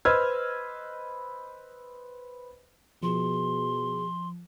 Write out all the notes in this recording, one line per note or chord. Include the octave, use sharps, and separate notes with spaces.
B4 C5 D#5 E6 F6 G#6
B2 F3 G#4 C6